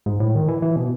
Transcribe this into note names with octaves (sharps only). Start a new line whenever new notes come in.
G#2
A2
D#3
E3
E3
B2